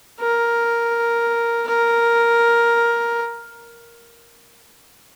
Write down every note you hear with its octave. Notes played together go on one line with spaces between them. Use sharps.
A#4
A#4